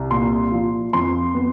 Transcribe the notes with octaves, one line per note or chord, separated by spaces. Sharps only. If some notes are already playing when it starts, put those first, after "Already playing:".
Already playing: C2
A#2 C6
F3
F2 C6
B3